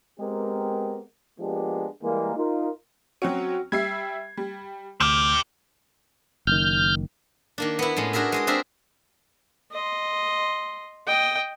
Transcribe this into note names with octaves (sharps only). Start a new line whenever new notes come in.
G#3 B3 C4 G4 A#4
F3 G#3 A#3 B3 D4 G4
E3 G3 G#3 A#3
D#4 F4 A#4
F#3 C4 C#4 F#4
G3 E5 G#6 C7
G3
D2 C4 G4 F6 G6 E7
F#1 D#3 F6 G6
D#3 A#3 D4
B3 E4
A2 G#3 C#4
D4 F#4 G#4 A#4 E5
G#3 G#4 D#5
C4 D4 A#4 E5 C6
D#5 C6
D#5 G5